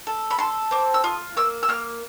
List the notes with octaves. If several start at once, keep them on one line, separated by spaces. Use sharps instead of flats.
A4
B5
A4 C6
C4 D6
E6
F4 D#6
A#3 E6
E6
A#3 F6